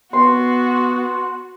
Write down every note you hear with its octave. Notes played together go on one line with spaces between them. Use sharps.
B3 F#4 C6